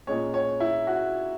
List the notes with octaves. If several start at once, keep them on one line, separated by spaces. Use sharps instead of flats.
A#2 G#3 C#4 C#5
C#5
E4
F#4